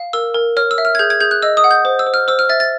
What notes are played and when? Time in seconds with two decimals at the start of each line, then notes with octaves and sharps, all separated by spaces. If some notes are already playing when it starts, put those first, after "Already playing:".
Already playing: F5
0.13 A#4 E6
0.34 A#4
0.57 C#5 F6
0.71 E6
0.78 E5
0.85 F6
0.95 G#6
0.99 G#4 G6
1.10 G#6
1.20 G#4 G6
1.31 F#6
1.42 D#5 E6
1.57 D#6
1.64 F#5
1.71 G6
1.85 C5
1.99 E6
2.06 C5
2.14 F6
2.28 C5 E6
2.39 F6
2.49 E5 A6
2.60 A6